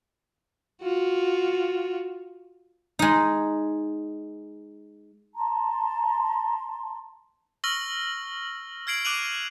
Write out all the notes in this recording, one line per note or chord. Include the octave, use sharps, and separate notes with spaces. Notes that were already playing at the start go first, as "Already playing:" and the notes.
F4 F#4
G#3 D#4
A5 A#5 C6
C#6 E6 F6 A#6 F#7 G7
F6 G#6 C7 D7 F#7
D6 F#6 D#7 F7 F#7